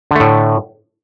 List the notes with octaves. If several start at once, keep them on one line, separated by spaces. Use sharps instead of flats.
A2 D3 A3